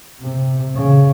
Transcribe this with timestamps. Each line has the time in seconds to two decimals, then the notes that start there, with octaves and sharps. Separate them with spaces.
0.21 C3
0.75 C#3